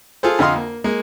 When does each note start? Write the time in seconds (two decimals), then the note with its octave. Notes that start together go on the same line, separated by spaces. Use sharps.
0.23 F4 G#4 A4 C5
0.39 F2 D3 D#5 F5 C6
0.56 A#3
0.84 G#3 A#3